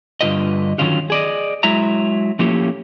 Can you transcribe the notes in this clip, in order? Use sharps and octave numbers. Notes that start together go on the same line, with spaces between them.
G2 D3 F3 F4 B4 D#5
D3 D#3 F#3 C#4 F4 F#4
G#4 D5 D#5
F#3 G#3 E4 E5 A#5
F3 A3 A#3 C#4 E4 G4